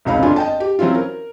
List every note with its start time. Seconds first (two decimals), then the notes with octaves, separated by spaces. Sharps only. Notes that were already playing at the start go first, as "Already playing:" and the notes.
0.05 F1 C#2 C#4 D#4 F5 B5
0.22 G1 D3 D4 F4 G#5
0.36 D#5 G5 A5
0.60 G4
0.79 F#3 C4 C#4 E4 F4
0.95 A#4